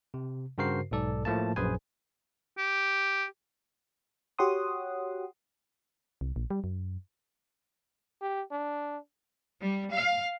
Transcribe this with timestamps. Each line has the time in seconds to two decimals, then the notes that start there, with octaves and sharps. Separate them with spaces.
0.14 C3
0.58 G2 C#3 F#4 A#4 C5 C7
0.91 B1 G#2 A4 D5
1.25 A2 F3 A3 A#3 A5
1.56 A#1 F#2 G#4 B4 C5 G#5
2.58 G4
4.39 F#4 G4 C#5 F#5 C6 D#6
6.21 C2
6.36 A#1
6.50 G3
6.64 F#2
8.22 G4
8.52 D4
9.61 G3
9.92 F5